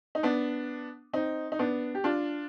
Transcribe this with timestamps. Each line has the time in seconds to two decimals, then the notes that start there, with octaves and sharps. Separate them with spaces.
0.15 D#4
0.23 B3 D4
1.13 C4 D#4
1.52 D#4
1.59 B3 D4
1.95 G4
2.04 D4 F4